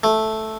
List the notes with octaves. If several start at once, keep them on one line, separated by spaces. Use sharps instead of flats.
A3